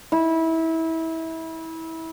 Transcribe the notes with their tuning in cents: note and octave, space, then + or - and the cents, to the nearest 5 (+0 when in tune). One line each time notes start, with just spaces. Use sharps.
E4 -25